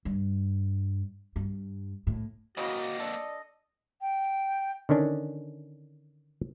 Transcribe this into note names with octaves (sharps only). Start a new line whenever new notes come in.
G2
G2
A2
C#3 E3 A#3 C4 F#4 A#4 D#5
D4 A4 D5
G5
D3 D#3 C#4 D4